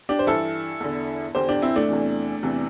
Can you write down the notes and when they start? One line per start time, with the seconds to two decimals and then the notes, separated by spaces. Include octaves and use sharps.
0.09 D4 G4
0.19 C5
0.27 G2 E3 E4 A4
0.80 E2 D3
1.35 E2 D3 G4 C5
1.49 D4 G4
1.62 C4 E4
1.76 A3 D4
1.89 E2 C3 E3
2.43 E2 C3 E3